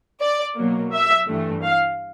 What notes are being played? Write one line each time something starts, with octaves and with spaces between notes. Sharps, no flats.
D5
B2 F#3 A#3
E5
G2 E3 A3
F5